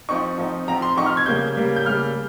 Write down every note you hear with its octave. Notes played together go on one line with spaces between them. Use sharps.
F3 C4 D#4 C#6
F3 C4 D#4
F3 C4 D#4 A#5
C6
F3 C4 D#4 C#6
F6
G#6
C#3 G3 A#3 G6
C#3 G3 A#3
G6
C#3 G3 A#3 F6